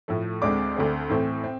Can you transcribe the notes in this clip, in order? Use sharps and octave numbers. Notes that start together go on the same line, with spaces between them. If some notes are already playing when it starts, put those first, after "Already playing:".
A2 F3 A3
D2 D3 G#3 C4 D5 D6
D2 D3 A3 C4
A2 E3 A3 C4
C4